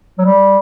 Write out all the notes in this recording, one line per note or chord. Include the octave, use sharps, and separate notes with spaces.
F#3
G3